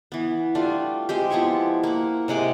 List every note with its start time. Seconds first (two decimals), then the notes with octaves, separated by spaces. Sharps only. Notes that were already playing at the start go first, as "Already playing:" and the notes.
0.12 E3 B3
0.55 G3 A3 D4 F4
1.09 G#3 C4 G4
1.30 F3 B3 E4 C#6
1.84 A#3 F#5
2.28 C3 G#3 F#5 D6